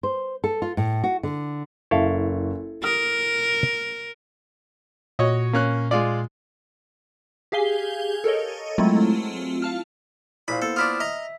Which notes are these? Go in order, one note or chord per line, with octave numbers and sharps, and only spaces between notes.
C5
A4
F4
A2
F#4
D3
F#1 E4 A4 F5 C#6
A#4 D#6 F6
A#2 F#4 C#5 D#5
A#3 C#4 F#6
G#3 F4 D5
G4 G#4 F5 G#5 G7
A4 A#4 C#5 D#5
F#3 G#3 A3 C4 E4 F4
F5 A5 F6
A#1 E4 C5 F5 B5
A#3 B3 A4 C5
D4 E4 F4 D#6 F6
D#5 E5 A#5